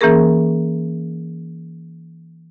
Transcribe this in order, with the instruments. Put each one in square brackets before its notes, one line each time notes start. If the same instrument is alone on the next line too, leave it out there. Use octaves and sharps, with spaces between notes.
[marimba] E3 A#3 C#4 G#4 A#4